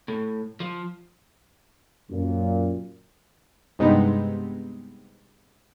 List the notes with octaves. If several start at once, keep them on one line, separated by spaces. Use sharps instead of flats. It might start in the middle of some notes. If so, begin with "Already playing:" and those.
A2
F3
F#2 A#2
G2 C3 G#3 B3 C4 D#4